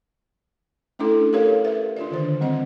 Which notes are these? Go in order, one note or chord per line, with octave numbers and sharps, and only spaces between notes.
A3 C#4 D4 E4 A4
G4 A4 A#4 C#5 F5
B4 E5
D4 F4 D5
D3 D#3 C5
G3 C4 D#5